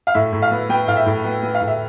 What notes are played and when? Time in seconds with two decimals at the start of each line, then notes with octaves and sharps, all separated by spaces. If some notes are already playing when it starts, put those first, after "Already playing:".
0.07 F5
0.15 A2 E5
0.33 A2
0.42 F5
0.51 B3
0.69 B3 G5
0.88 A2 F5
0.97 E5
1.06 A2
1.24 B3
1.43 B3
1.55 F5
1.61 A2
1.68 E5